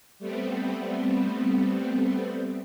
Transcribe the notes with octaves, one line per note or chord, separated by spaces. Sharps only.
G3 A3 B3 C4